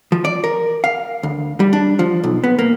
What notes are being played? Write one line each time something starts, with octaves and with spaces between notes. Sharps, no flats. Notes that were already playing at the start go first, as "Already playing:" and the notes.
F3
D5
A#4
F5
D2
G3
D4
F3
B1
B3
A#3